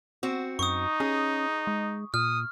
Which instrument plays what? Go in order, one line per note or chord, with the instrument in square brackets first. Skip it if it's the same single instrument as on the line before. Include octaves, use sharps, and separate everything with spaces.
[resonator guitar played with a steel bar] C4 F#4
[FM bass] F#2 [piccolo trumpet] D#4 [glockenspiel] C#6 D#6
[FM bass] C#4 [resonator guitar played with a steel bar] G#4
[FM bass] G#3
[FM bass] A#2 [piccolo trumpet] D#6 [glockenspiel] F6